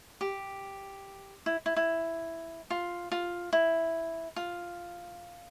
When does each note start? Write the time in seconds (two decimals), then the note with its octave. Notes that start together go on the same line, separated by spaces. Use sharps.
0.21 G4
1.46 E4
1.66 E4
1.76 E4
2.70 F4
3.12 F4
3.53 E4
4.36 F4